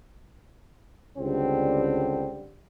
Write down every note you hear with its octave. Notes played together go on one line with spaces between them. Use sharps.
C#2 D3 G3 C4